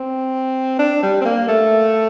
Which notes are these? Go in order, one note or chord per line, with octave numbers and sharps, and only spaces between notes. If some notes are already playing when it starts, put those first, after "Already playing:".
Already playing: C4
D4
G3
C4
A#3
A3